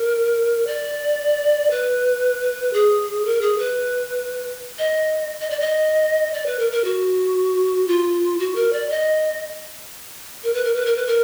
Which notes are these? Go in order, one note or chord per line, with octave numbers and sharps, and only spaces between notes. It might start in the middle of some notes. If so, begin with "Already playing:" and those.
Already playing: A#4
D5
B4
G#4
A#4
G#4
B4
D#5
D#5
D5
D#5
D5
B4
A#4
A#4
F#4
F4
F#4
A#4
D5
D#5
A#4
B4
A#4
B4
A#4
B4
A#4